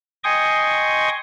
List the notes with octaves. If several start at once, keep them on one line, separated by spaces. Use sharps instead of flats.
D#5 G5 G#5 C6 C#6 D#6